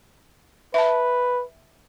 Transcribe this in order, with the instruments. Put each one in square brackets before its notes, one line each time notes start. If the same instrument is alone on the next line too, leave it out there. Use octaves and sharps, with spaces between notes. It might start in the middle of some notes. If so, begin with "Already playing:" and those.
[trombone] B4 [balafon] E5 A5